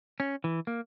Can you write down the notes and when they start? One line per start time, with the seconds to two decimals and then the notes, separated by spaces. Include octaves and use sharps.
0.20 C#4
0.44 E3
0.67 A#3